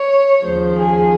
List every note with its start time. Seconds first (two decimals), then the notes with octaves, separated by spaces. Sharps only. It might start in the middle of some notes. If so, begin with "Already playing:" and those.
Already playing: C#5
0.44 D#2 C#3 F3 C5
0.77 G#4